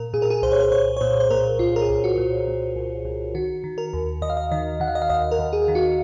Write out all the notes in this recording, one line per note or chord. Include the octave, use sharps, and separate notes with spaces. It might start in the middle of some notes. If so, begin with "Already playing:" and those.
Already playing: A#2 A#4
A#2 G#4
A#4
G#4
C2 C5
C#5
C5
C2 C#5
C#5
A#2 C5
C5
A#2 A#4
C2 F4
A#4
G#4
C2
F#4
A#2
A#2
C2
C2
D#3 F#4
D#3
A#4
D#2
D#2 D#5
F5
D#5
D#3 D#5
D#3 F#5
F5
D#5
F5
D#2 D#5
A#4
D#2
G#4
D#3
F#4